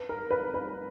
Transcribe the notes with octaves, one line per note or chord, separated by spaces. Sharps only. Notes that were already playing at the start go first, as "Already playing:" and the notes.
Already playing: B4
A#4
B4
B4